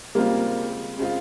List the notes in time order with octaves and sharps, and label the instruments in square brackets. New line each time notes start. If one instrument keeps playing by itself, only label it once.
[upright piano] C#3 G#3 C4 F4 [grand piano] G3 A#3
[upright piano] C#3 G#3 C4 F4